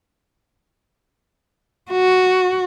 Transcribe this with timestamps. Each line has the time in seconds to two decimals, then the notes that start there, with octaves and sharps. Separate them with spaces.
1.91 F#4